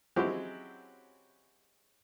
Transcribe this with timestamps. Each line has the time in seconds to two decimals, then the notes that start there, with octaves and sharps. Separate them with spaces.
0.16 F#3 G#3 C4 C#4 E4 G4